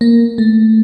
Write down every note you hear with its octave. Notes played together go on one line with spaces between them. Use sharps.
A#3
A3